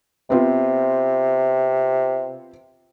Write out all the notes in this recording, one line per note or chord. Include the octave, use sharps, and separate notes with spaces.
C3 B3 C4 F4